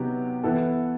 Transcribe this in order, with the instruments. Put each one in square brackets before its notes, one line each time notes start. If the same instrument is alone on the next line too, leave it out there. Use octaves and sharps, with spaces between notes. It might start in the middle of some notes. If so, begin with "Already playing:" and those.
Already playing: [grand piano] C3 F#3 B3 D#4 G4
E3 B3 E4 A4